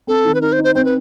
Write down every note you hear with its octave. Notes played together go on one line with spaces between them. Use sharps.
C4 A4
D#3
B4
D#4 A#4
C5
D#4
C5
C4 C5
B4